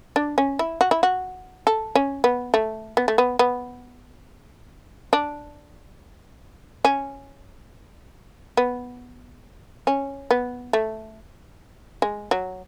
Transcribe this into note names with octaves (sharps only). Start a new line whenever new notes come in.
D4
C#4
E4
F#4
E4
F#4
A4
C#4
B3
A3
B3
A3
B3
B3
D4
C#4
B3
C#4
B3
A3
G#3
F#3